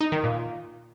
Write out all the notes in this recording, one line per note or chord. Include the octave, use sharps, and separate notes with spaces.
D#4
D#3
A#2